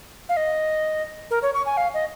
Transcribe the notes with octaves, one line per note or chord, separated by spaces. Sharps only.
F5
D#5
A#4
C#5
C#6
G#5
F5
D#5